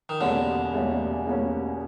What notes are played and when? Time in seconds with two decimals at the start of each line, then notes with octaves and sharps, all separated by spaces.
0.09 D#3
0.20 E2 B2 D3 G3 A#3 C#4
0.73 E2 B2 G3 A#3 C#4
1.27 E2 B2 G3 A#3 C#4